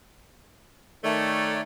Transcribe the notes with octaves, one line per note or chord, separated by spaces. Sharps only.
D#3 A3 C#5 D5